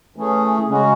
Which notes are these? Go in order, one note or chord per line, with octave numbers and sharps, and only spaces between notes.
E3 A3 C#4 G#4
C#3 G#3 C#4 F#4